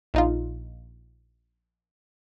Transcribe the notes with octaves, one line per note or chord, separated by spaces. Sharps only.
A#1 D#4 F4